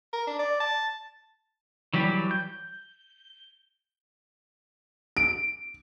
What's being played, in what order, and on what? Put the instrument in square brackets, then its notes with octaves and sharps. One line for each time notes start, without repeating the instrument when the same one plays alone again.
[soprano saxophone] A#4
D4
D5
A5
[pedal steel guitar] E3 F#3 G3 G4
G6
[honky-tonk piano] D7